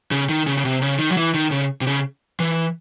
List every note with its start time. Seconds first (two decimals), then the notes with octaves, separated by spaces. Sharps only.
0.11 C#3
0.29 D#3
0.47 C#3
0.57 C#3
0.65 C3
0.82 C#3
0.99 D#3
1.11 F#3
1.17 E3
1.34 D#3
1.51 C#3
1.81 C3
1.87 C#3
2.40 E3